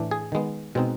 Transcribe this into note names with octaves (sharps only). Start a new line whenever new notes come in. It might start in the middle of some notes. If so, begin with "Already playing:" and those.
Already playing: A2 E3 A3 D4
G#4
D#3 G#3 B3
B2 G#3 C4 D#4